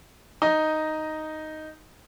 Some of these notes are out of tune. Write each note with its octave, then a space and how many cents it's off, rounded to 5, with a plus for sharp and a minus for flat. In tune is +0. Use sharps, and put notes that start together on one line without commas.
D#4 +0 D#5 +0